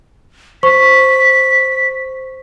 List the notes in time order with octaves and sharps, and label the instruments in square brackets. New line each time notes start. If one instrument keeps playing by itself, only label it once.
[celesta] C5 C#6 [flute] B6